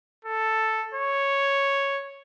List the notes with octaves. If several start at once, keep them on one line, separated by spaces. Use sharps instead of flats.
A4
C#5